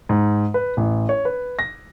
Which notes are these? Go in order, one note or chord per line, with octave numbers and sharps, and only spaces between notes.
G#2
B4
A1
C#5
B4
A#6